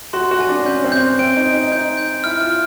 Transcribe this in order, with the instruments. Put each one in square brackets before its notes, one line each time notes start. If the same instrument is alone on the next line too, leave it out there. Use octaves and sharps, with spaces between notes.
[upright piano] F#4 [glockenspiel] C6
[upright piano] F#4
[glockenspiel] G#5
[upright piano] D4
[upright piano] C#4 [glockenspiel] G6
[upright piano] C4
[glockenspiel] G6
[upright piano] C#4
[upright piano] C4 [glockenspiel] D7
[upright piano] D#4
[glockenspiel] G6
[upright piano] D#4
[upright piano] D#4 [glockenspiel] G6
[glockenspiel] G6
[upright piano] E4 [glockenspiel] F6
[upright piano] F4
[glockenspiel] F6